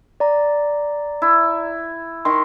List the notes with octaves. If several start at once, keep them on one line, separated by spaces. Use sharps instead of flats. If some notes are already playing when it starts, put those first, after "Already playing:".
D5 A#5
E4
D#3 C6